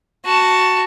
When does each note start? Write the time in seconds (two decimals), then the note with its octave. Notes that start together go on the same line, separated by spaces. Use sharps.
0.25 F#4 A5